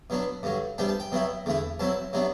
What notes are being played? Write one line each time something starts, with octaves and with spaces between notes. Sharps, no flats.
B2 F#3 B3 D4
G2 D3 F#3
C3 G3 B3 D4 G5
A5
G5
B2 F#3 B3 E4
E2 D3 A3 E4
B2 F#3 C4 E4 A5
C3 F#3 B3 D4